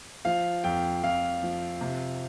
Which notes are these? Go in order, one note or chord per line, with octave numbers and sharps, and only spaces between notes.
F3 F5
F2 G5
F2 F5
F3
C3